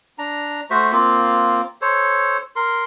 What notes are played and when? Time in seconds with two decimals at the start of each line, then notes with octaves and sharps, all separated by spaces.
0.18 D4 A#5
0.70 A3 F#4 C5 E5
0.92 A#3 C4 F4
1.81 A4 C5 C#5
2.56 A#4 C6